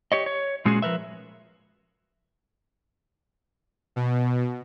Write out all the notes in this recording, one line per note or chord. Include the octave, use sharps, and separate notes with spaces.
G4 C#5 D#5
C#5
A#2 G#3 C#4 F#4 G#4
F3 A#4 B4 E5
B2